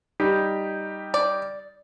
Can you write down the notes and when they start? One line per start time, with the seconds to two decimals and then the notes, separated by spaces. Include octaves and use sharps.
0.20 G3 D#4 G4
1.14 D5